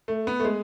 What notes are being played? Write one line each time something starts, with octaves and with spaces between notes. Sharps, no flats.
A3
B3
A3
G#3